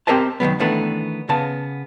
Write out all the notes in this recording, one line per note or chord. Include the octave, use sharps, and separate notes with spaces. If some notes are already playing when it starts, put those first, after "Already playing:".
C4 G4 A#4 C5 D#5 A5
D#3 E3 F#3 B3
D#3 E3 A3 B3 D4
C#3 B3 A5